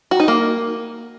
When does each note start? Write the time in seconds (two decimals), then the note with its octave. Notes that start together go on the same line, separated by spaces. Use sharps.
0.11 F#4
0.20 D#4
0.28 A#3